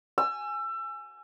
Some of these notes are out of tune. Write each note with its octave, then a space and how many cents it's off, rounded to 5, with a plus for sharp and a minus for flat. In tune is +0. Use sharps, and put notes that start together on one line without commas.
G#5 +0 E6 +30